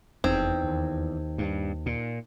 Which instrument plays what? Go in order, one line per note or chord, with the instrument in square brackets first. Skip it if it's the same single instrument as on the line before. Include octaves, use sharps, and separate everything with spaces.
[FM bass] F1 [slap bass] E2 [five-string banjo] C4 [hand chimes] D#4
[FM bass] D#2
[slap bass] G2
A#2